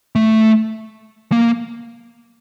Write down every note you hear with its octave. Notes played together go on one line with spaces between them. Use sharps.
A3
A#3